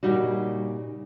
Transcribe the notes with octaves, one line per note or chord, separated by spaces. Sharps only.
A#2 C#3 G3 D#4 F#4